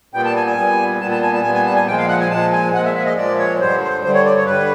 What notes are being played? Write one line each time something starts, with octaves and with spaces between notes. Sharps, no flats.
A#2 G3 B3 G5
A5
G#5
G#5
A#2 G3 B3
A#2 G3 B3 A5
A5
G#5
A5
A#2 G3 B3 G#5
G#5
A5
G#5
A#2 F3 G#3 G5
F5
F#5
G#5
A#2 F3 G#3 A5
G#5
A#2 F3 G#3 F#5
E5
E5
D#5
A#2 F3 G#3 D5
C#5
G2 D3 G3 C5
C5
G2 D3 G3 C5
C#5
D5
C#5
D3 G3 B4